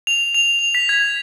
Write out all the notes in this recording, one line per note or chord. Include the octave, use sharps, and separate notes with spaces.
F7
F7
F7
B6
G#6